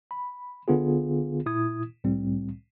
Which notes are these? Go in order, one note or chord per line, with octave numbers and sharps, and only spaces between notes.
B5
G#1 D3 B3 F4 G#4
A#2 E4 D#6 G#6
C2 A2 G3 C4